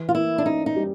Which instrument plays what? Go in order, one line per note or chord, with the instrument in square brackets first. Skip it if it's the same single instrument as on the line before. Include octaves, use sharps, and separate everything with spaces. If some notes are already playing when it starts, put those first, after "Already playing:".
Already playing: [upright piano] E3
[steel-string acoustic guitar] F4
[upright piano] A#3 [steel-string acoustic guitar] E4
[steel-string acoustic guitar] D4
[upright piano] C#4 [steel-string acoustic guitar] D#4
[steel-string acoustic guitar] D#4
[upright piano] G3